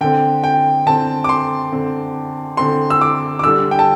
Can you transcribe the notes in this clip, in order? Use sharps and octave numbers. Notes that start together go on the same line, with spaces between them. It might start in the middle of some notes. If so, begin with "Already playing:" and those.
D3 C4 G5
G5
D3 C4 A5
D6
C6
D3 C4
D3 C4 C6
E6
D6
D6
D3 G3 D4 E6
G5
A5